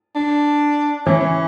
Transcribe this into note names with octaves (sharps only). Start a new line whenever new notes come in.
D4
E3 C#4